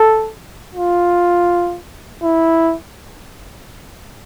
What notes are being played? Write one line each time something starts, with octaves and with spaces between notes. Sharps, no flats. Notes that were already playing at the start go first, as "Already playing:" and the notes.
Already playing: A4
F4
E4